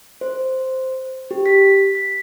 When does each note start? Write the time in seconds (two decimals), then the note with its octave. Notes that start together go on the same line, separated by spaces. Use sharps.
0.21 C5
1.31 G4
1.46 B6
1.95 B6